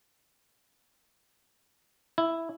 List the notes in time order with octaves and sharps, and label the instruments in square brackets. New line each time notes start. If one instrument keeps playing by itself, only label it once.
[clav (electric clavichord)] E4